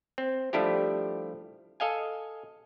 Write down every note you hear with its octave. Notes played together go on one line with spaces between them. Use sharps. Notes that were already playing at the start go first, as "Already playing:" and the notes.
C4
F3 G3 A3 D4 E4 G4
A4 D#5 F5 G#5